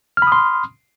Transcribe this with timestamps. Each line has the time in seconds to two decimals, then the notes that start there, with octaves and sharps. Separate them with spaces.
0.17 F6
0.22 B5
0.27 D#6
0.32 C6